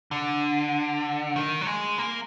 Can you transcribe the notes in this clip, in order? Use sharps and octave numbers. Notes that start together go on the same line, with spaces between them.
D3
D#3
F#3
G#3
A#3